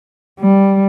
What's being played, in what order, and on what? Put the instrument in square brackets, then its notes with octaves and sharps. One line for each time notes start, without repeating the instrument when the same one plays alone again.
[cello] G3